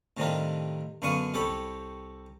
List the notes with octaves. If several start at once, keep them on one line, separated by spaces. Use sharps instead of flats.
A2 C3 D#3 G3 D4 F4
F#2 D3 B3 F5 C#6 D#6
C2 G4 A4 C#5 B5